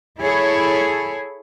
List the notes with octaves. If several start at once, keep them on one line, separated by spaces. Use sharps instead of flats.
E4 G#4 A4 C#5